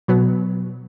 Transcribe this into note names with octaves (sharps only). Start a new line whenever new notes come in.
B2 F#3 B3